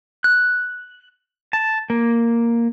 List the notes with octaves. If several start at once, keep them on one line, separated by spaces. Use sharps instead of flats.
F#6
A5
A#3